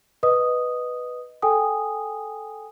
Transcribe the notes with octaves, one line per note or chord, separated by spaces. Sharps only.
B4 D#5 D#6
A4 G5 G#5 D#6